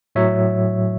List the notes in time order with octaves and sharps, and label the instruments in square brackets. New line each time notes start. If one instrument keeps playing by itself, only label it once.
[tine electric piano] A2 F#3 C#5 E5